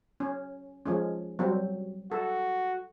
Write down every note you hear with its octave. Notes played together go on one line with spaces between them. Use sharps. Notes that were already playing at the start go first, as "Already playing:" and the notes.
C#4
F3 G#3 C#4
F#3 G3 C4
F#4 A4